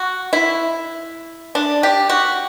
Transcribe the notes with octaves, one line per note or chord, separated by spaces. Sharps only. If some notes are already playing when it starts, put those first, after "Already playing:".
Already playing: F#4
E4
D4
G4
F#4